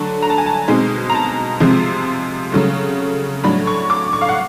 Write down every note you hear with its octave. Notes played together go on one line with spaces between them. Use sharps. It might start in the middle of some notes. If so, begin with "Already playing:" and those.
Already playing: D3 F#3 A3 D4 A5
A#5
A5
G#5
A5
B2 G#3 C4 D#4
A#5
A5
C3 F3 G#3 C4
C#3 F#3 A3
A2 F#3 A3 D4 B5
C#6
D6
C#6
F5
F#5